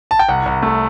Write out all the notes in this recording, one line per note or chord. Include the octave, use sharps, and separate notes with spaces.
A5
G5
C2 F#5
C2
A3